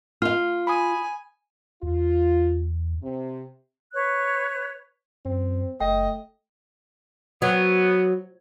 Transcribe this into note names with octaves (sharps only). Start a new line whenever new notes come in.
F4 F5 F6
G#5 B5 D#6
E2 F4
C3 C4
B4 C#5 F#6
F#2 C4
F#1 A3 D#5 G5
F#3 B3